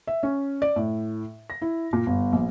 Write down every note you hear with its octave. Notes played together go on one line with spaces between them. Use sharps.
E5
C#4
D5
A2
A#6
E4
A#2
G1
A#1